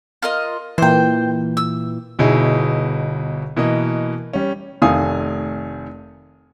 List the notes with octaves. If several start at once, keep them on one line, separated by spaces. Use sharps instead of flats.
F4 A#4 D#5
A#2 E3 C5 G5
E6
G1 B2 D#4 E4 G#4
B2 E3 A#3 D#5
G3 C#4
F1 D#3 A3 F5 G#5 D#6